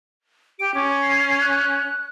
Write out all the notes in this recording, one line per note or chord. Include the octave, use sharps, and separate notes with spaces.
G4 D7
C#4 D6
C7
F#6